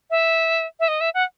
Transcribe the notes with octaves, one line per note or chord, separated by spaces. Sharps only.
E5
E5
D#5
E5
F#5